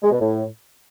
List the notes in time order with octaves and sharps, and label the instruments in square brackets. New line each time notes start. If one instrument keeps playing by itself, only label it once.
[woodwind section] G#3
B2
A2